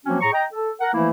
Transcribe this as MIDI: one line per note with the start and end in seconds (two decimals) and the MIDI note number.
0.06 0.19 53
0.06 0.19 54
0.06 0.19 58
0.06 0.19 60
0.06 0.19 61
0.06 0.19 66
0.21 0.31 45
0.21 0.31 68
0.21 0.31 82
0.21 0.31 85
0.33 0.45 75
0.33 0.45 79
0.33 0.45 82
0.52 0.71 69
0.81 0.91 70
0.81 0.91 78
0.94 1.10 52
0.94 1.10 53
0.94 1.10 57
0.94 1.10 58
0.94 1.10 64